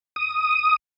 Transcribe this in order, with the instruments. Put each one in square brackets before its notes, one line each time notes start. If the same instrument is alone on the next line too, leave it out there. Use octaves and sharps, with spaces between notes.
[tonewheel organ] D#6